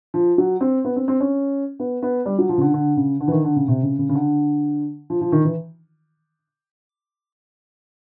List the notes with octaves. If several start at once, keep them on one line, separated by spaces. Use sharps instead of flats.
F3
F#3
C4
B3
C4
C4
C#4
B3
B3
G3
F#3
F3
C#3
D3
D3
C#3
D3
E3
D#3
D3
C#3
C3
C#3
C#3
C#3
D3
F3
F3
D#3
E3